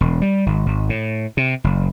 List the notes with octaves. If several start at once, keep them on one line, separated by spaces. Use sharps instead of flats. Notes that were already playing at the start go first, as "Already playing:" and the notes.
E1
G3
G#1
G#1
A2
C3
F#1